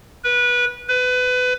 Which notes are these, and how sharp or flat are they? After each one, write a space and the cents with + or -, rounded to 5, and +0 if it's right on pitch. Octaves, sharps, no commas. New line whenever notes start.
B4 -20
B4 +25